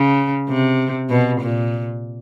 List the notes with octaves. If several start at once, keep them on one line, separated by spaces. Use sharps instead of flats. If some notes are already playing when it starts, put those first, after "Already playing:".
Already playing: C#3
C3
B2
A#2